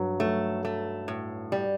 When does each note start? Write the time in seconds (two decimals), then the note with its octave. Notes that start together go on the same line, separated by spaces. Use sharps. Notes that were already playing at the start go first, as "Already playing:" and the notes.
Already playing: G2 F#3
0.20 F#3 A3
0.65 A3
1.08 A2
1.52 G3